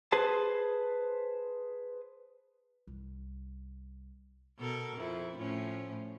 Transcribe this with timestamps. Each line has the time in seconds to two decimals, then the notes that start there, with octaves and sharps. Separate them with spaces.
0.12 G#4 B4 C5 A5
2.87 C2
4.59 B2 A4 A#4
4.97 F2 E4
5.38 A2 F3 C#4